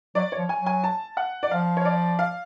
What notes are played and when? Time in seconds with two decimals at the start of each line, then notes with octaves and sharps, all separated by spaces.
0.15 F#3 D5
0.32 C#5
0.38 F3
0.49 G#5
0.61 F#3
0.66 G#5
0.84 A5
1.17 F#5
1.43 D5
1.51 F3 F5
1.77 C#5
1.85 D5
2.19 F5